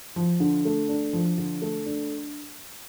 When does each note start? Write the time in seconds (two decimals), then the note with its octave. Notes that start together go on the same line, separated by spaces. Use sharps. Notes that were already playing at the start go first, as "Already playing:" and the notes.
0.16 F3
0.40 D3
0.65 A3
0.89 D4
1.13 F3
1.38 D3
1.62 A3
1.86 D4